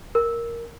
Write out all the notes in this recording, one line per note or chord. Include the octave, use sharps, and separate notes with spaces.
A#4